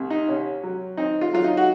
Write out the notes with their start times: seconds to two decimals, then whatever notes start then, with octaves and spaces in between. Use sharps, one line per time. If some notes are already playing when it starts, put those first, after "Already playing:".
Already playing: C2
0.10 D#4
0.28 C3 C#4
0.64 F#3
0.97 C4 D#4
1.21 F4
1.33 F#3 F4
1.44 D#4
1.57 F#4